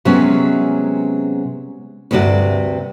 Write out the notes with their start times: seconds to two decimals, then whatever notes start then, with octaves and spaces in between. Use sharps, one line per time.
0.05 C3 F#3 G#3 B3 C#4
2.11 D2 G2 C3 F#4 D5